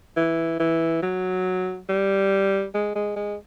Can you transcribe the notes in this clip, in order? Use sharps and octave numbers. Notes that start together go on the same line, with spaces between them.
E3
E3
F#3
G3
G#3
G#3
G#3